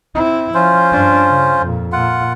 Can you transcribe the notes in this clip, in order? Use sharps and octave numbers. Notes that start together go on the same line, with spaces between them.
C4 E4
F3 C#4 F4 C5
G2 D4
C#3
F2 A#2
A#2 F4 F#5